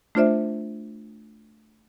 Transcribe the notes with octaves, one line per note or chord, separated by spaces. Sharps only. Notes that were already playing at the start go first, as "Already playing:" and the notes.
A3 D4 F4 C5 D5 E5